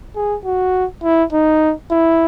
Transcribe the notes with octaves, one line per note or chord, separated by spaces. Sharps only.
G#4
F#4
E4
D#4
E4